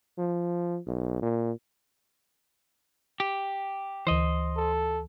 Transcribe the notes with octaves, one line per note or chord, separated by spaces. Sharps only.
F3
B1
A#2
G4
D2 E3 C5 D#5
A4